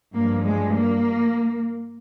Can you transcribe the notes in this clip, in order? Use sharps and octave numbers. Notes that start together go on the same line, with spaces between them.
G2 F3 A#3
G#3
A#3